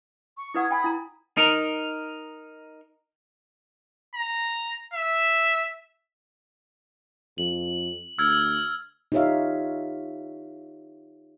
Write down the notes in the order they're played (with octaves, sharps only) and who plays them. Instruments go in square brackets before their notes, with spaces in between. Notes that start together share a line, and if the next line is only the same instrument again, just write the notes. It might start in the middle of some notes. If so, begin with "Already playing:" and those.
[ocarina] C#6
[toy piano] E4 B4 F#5 [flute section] D#6 G#6
[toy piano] G5 G#5 [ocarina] B5
[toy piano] E4 A#5
[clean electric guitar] D#4 A#4
[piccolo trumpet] A#5
E5
[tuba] F2 [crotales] F#7
[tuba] D2 [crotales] E6 F6 G#6
[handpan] D#4 F4 G4 C#5 E5 F5